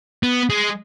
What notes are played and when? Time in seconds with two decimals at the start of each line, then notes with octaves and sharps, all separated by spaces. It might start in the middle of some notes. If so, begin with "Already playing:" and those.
0.23 B3
0.50 G#3